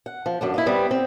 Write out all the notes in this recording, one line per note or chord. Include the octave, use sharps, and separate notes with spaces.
F#5
F3
F#2 D3 D4
A#3 D#4 E4
G3 B3 C4
C4